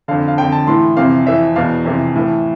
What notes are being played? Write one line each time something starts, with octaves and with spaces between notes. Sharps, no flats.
F2 D3 F5
F5
F2 D3 G5
A5
A2 E3 C6
F2 C3 E3 F5
F2 E3 E5
E2 B2 F5
F2 C3 E3
A2 E3